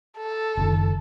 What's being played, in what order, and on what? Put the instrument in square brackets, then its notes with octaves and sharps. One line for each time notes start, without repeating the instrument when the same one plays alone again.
[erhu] A4
[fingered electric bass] F#1 C3 D#3